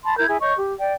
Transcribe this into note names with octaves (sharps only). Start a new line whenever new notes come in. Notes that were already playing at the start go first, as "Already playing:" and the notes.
A5 B5 C6
E4 A#4 G6 G#6
E4 G#4 E5
C#5 D#5 C#6 G6
G4
D5 G5